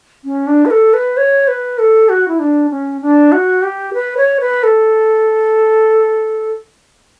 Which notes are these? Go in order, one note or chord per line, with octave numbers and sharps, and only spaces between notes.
C#4
D4
B4
A4
B4
C#5
B4
A4
F#4
E4
D4
C#4
D4
F#4
G4
B4
C#5
B4
A4